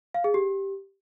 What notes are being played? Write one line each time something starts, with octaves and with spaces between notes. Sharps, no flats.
F5
G#4
G4